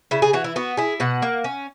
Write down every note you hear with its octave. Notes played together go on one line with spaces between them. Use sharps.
C#3 E4
G#4
E3 F#4
E4
B3 F#4
E4 G#4
B2 F#5
A#3
C#4